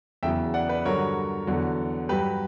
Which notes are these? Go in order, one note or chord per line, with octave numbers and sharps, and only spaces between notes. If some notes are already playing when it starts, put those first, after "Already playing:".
E2 C#3 F#3 E5 G5
D5 F#5
B4 D5
G2 D3 F#3 A#4 C#5
E2 D3 F#3
G2 F#3 G4 B4